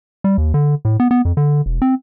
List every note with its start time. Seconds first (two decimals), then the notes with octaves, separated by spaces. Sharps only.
0.24 G3
0.38 D#2
0.54 D3
0.85 A2
1.00 B3
1.11 B3
1.25 F2
1.37 D3
1.66 E1
1.82 C4